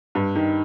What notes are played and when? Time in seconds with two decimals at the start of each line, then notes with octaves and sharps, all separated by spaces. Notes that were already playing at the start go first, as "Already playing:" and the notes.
0.15 G2
0.35 D#3